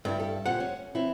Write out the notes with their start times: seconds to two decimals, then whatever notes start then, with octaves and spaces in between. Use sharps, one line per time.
0.05 G2 B3 E4
0.19 A4
0.46 A#2 G4 C5 F#5
0.60 C#4
0.95 E3 C4 E4